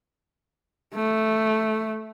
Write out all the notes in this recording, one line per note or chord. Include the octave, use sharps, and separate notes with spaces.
A3